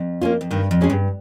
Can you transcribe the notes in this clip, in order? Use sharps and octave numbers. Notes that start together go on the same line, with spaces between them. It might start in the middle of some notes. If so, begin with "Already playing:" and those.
Already playing: F2
A#3 C#4 F4
F2
G2 D#3
F2
G#3 C#4 G#4
G2